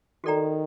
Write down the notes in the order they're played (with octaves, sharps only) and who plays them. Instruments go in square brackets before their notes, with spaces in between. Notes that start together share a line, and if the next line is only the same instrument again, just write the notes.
[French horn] D#3 [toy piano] F#4 A4 D5 G5 A#5